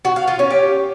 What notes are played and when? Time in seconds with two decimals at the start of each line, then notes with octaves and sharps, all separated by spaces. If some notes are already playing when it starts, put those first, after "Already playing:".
0.05 F#4
0.16 F5
0.28 F4
0.39 C#4
0.50 G4